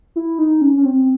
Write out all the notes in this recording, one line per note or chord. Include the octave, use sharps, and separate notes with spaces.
E4
D#4
C#4
C#4
C4